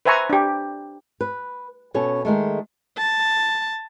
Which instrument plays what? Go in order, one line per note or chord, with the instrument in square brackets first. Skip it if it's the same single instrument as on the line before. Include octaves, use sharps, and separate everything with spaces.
[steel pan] B4 C5 E5 G#5 A#5 C#6
D4 G4
[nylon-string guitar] B4
B2 C#4 A4 C#5
D#3 G#3 A3
[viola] A5